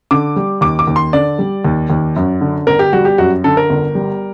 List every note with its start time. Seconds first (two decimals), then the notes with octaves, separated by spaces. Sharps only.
0.11 D3 D6
0.36 G3
0.61 D#2 D6
0.79 D6
0.87 D#2
0.96 C6
1.13 D3 D5
1.39 G3
1.65 D#2
1.90 D#2
2.16 F#2
2.41 D3
2.67 G1 A#4
2.79 G4
2.93 G3 F#4
3.05 G4
3.18 F#2 F#4
3.44 D3 A4
3.57 A#4
3.70 G1
3.95 G3